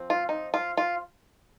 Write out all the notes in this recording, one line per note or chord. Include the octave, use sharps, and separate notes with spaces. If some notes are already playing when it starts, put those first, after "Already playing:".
Already playing: F3 C4
F4
D#4
F4
F4